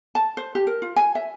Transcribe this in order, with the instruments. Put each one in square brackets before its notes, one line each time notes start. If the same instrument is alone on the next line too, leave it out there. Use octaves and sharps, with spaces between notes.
[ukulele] A5
C5
G4
A#4
F4
G#5
E5